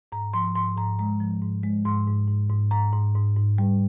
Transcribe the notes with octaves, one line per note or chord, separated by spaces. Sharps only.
G#2 A#5
F3 C6
G#2 C6
G#2 A#5
G#3 A#5
F3
G#2
G#3
G#2 C6
G#2
G#2
G#2
G#2 A#5
G#2
G#2
G#2
G3